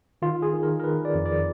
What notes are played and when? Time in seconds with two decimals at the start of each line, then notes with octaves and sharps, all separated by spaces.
0.22 D#3 F4
0.42 G#4
0.53 D#3
0.63 A#4
0.80 A#4
0.84 D#3 B4
1.05 D5
1.15 F2
1.26 D5